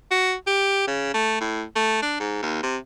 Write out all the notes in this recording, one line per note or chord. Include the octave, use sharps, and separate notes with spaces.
F#4
G4
C#3
A3
A2
A3
D4
G#2
D#2
C3